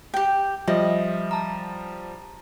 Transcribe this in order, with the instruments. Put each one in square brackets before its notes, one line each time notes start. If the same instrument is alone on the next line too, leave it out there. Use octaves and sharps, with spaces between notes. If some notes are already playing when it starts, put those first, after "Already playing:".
[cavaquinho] G4 G5
[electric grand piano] F3 G3 [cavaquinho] D#5 [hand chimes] E5
[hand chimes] A5 A#5